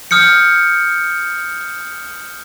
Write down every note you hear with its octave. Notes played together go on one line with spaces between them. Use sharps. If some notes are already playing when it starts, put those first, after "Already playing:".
D#6 F6 G6 C#7